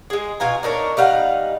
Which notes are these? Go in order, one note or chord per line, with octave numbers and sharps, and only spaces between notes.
G#3 G#4
B2 F4 G#5 A#5
D4 D#4 A#4 C#5
G3 D#4 F5 F#5